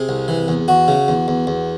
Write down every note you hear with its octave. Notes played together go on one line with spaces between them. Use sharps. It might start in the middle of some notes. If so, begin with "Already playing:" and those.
Already playing: C3 G#4
C2
E3
E2
E2 F#4
C#3
E2
E2
E2